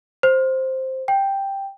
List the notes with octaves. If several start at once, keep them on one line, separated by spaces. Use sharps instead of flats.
C5
G5